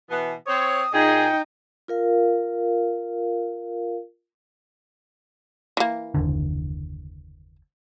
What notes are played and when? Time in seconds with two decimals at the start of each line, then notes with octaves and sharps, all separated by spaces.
0.11 B2 E3 B3
0.47 C4 C5 C#5 D#6
0.94 A#2 D#4 G#4 G5
1.88 F4 A#4 F5
5.77 E3 A#3
6.14 F#1 D#2 D3